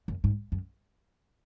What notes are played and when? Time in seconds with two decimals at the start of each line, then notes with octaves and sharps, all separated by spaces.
0.08 F#2
0.24 G#2
0.52 F#2